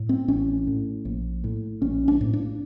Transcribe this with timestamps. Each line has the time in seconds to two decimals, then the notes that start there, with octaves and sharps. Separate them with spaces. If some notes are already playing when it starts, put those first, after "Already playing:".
Already playing: A2
0.09 C4
0.28 A1 C#4
0.67 A2
1.05 A#1
1.44 A2
1.82 A#1 C#4
2.08 D4
2.21 A2
2.33 D4